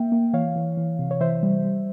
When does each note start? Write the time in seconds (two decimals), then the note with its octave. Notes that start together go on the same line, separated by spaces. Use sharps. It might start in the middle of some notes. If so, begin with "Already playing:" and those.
Already playing: A#3 E5 G5
0.12 A#3
0.33 E3 C#5 F5
0.56 E3
0.77 E3
0.99 C3
1.11 C#5
1.21 E3 C5 E5
1.43 G3
1.65 G3